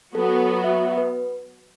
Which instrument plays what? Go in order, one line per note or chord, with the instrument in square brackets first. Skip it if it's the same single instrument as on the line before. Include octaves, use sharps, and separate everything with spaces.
[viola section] F#3 B3 F#4 [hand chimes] A4
[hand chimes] E5
B4